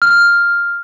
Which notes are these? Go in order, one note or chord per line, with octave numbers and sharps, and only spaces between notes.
F6